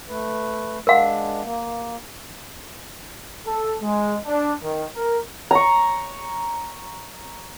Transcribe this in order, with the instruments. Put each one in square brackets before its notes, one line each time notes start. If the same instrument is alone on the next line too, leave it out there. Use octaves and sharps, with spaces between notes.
[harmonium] A3 B4
[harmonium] G#3 D4 [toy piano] A#4 F5 F#5
[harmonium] A#3
[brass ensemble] A4
G#3
D4
D#3
A#4
[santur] A#5 C#6